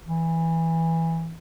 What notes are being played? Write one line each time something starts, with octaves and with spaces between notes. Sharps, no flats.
E3